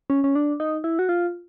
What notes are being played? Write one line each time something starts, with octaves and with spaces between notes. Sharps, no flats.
C#4
C#4
D4
D#4
E4
F#4
F4